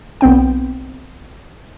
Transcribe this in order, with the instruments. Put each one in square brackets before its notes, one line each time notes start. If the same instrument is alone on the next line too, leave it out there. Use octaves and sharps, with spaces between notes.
[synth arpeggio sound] B1 B3 C4 G5